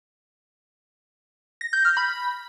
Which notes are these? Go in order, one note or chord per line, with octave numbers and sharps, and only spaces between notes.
A#6
G6
F6
B5